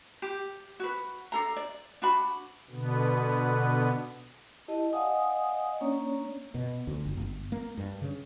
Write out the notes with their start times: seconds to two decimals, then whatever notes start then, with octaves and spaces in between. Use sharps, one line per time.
0.22 G4
0.80 F#4 B4
1.32 D4 A4 A#5
1.57 D5
2.02 D4 F#4 B5
2.70 B2 D3 B3
4.68 E4 G4 D#5 A5
4.93 D5 D#5 F5 F#5 G#5 D#6
5.81 A#3 C#4 D4 C#5 D5
6.54 B2
6.87 D2
7.05 G1
7.17 G1
7.52 A#3
7.78 G2
8.02 C#3